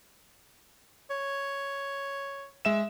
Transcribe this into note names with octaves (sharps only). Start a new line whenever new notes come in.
C#5
G#3 E5 E7